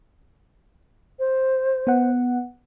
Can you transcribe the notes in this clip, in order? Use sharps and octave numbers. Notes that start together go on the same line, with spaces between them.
C5
B3 F#5